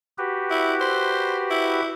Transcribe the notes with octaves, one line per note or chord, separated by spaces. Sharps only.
F#4 G4 B4
E4
C5
E4